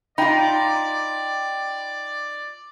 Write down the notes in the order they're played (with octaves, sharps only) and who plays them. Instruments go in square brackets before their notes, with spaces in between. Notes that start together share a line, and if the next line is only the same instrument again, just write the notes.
[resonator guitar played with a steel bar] D#4 F4 [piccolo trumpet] D5 [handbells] G5 B5